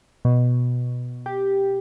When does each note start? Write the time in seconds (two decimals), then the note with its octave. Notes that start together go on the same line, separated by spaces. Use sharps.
0.25 B2
1.26 G4